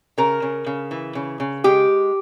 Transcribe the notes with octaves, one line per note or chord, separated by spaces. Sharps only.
C#3 A#4
C#3
C#3
E3
C#3
C#3
G#3 G4